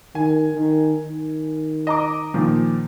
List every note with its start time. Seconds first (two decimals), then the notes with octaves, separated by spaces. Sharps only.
0.15 D#3 G#5
0.55 D#3
1.05 D#3
1.87 D#5 A#5 D6
2.34 A#2 D#3 F3